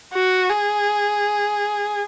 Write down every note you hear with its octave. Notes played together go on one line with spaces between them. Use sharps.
F#4
G#4